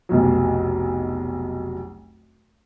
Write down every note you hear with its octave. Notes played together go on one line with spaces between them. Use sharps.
F1 B1 F#3